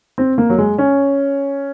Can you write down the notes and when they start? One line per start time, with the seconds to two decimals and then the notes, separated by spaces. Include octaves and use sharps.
0.18 C4
0.38 A#3
0.50 F#3
0.58 G#3
0.78 C#4